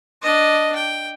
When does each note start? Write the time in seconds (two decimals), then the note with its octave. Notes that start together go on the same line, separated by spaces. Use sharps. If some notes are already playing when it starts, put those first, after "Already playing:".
0.22 D4 D#5
0.75 G5